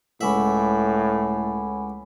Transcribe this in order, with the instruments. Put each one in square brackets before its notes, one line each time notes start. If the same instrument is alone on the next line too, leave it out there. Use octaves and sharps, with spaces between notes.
[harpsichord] C#2 E5 [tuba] A2 [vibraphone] F#5 G#5 B5